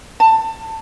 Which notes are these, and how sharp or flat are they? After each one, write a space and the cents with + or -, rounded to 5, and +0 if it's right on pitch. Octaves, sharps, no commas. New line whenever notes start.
A5 +20